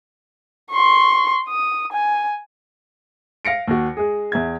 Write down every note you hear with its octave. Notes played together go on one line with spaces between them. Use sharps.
C6 C#6
D#6
G#5
F5 A#6 C#7 D7
D#2 F#4
G#3 G#4
E2 E5 G#6